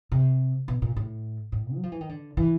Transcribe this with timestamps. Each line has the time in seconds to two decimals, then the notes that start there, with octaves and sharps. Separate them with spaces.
0.12 C3
0.68 B2
0.82 A#2
0.96 A2
1.52 A2
1.75 F#3
1.83 F3
1.92 E3
2.01 D#3
2.09 D3
2.37 E3